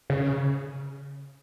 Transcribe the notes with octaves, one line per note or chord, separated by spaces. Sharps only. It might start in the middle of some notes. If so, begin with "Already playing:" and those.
C#3